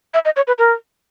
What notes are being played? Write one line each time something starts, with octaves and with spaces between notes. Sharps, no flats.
E5
D#5
C#5
B4
A#4